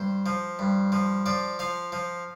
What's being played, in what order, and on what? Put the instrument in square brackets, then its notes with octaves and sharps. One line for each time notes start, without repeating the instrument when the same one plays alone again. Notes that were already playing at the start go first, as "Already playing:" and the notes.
Already playing: [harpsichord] G2 C5
F3
G2
F3
F3 D5
F3 F5
F3